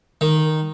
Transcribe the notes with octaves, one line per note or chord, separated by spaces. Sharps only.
D#3